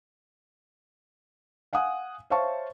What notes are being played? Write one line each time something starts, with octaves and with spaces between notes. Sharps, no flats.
F5 F#5 G#5 D#6
C5 C#5 E5 F5 A5 C#6